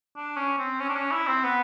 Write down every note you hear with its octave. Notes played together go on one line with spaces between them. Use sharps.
D4
C#4
C4
C#4
D4
C#4
E4
C4
B3